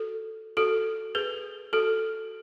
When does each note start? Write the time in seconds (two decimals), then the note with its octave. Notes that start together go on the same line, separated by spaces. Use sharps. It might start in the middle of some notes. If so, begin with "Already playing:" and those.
Already playing: F#4 A4
0.57 F#4 A4
1.15 G#4 B4
1.73 F#4 A4